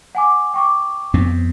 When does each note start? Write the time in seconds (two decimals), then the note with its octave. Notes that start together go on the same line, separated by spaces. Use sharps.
0.15 F#5 G#5 D6
0.54 G5 C#6 D6
1.14 F2 B3 C4